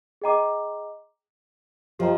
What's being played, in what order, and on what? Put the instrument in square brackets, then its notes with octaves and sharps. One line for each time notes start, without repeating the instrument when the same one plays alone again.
[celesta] G#4 D#5 G5 A#5 D6
[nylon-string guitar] F3 [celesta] G4 C5 D#5 G5 A#5